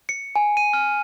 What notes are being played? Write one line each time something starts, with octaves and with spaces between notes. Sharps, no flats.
C#7
G#5
D#7
F6